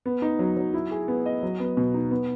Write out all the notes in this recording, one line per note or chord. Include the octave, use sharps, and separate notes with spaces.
B3
D#4
F#3
F#3
E4
G#4
B3
D#5
F#3
B3
B2
D#4
B3